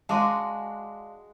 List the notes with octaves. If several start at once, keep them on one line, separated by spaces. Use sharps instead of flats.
G#3 D4 F#4 D#5 F5 A5 C6 D6